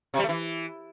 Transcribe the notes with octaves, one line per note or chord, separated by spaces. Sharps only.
C3
G3
A3
E3